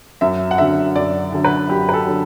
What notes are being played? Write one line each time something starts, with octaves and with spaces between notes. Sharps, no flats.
F#2 E5
F#5
D3 F#3 E5
F#2 D5
D3 F#3
B4
F#2 G4
B4
A4
D3 F#3